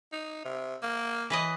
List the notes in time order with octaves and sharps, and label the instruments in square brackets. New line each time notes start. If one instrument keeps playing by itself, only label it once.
[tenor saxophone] D#4
C3
A#3
[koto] E3 B4 D#5